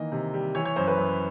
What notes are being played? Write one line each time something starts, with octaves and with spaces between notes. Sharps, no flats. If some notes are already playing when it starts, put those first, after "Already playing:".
Already playing: D#3 E3 A#3 D#5
C3
G3
E3 C#5
C#5
F#2 C5
B4
F#2